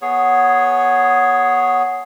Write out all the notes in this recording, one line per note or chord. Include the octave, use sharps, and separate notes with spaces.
B3 G#4 C#5